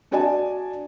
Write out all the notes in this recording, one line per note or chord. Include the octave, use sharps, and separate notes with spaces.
D4 F#4 D5 D#5 G#5 A5